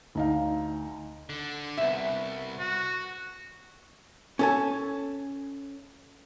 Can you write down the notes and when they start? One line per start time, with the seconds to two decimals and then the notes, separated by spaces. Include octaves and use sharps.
0.15 D2 D#4 F5
1.30 D3
1.78 C2 B3 E5
2.59 F#4
4.39 C#4 A4 G#5